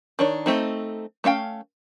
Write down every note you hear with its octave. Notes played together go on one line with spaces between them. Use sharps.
D#3 D4 C#5
A3 C4 D#4
A3 C#4 F5 G5